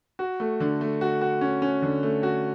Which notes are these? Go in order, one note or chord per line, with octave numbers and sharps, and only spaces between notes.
F#4
A3
D3
A3
F#4
F#4
C#4
C#4
D3
A3
F#4